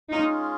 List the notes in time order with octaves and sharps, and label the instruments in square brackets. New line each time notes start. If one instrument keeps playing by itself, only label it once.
[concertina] G#3 C#4 F4 G#4 [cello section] D#4